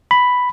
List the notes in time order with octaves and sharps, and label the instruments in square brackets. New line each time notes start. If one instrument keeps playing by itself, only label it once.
[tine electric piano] B5